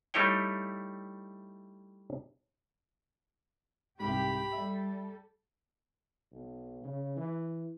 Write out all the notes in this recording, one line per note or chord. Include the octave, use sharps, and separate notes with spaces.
G3 A3 D#4 E4 C#5 G5
C2 G#2 G4 B5
G3 A4 E5
B1
C#3
E3